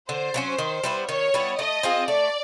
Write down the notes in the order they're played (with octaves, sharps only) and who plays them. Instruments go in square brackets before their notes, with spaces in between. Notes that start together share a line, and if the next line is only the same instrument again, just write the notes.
[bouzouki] D3 [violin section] C5
[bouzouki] F#3 A#3 C#4
D#3
G3 B3 E4
[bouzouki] D#3 [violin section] C#5
[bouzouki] G3 B3 E4
[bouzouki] A3 [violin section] D#5
[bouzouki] C4 F4 G#4
[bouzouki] A3 [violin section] D5